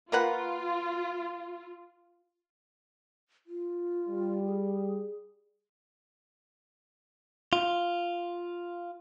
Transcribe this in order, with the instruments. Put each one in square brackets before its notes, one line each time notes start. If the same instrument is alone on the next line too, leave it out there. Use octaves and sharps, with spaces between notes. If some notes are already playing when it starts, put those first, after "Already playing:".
[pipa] A#3 B4 F#5 [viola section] F4
[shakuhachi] F4
[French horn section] G3
[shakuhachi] G#4
[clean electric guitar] F4